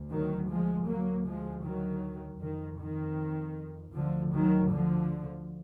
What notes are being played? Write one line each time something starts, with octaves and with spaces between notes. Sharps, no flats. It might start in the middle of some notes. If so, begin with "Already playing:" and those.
Already playing: D2
D#3 F#3
F3 G#3
D2 F#3 A#3
F3 G#3
D#3 F#3
F2 D#3
D#3
D2 D3 F3
D#3 F#3
D3 F3